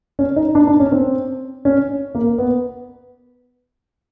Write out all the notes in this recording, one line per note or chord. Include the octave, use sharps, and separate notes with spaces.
C#4
D#4
D4
D4
C#4
C4
C#4
A#3
B3